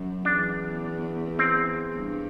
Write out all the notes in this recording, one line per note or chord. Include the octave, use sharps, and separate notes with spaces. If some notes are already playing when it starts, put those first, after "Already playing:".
Already playing: F#2
E2 D4
C4
G2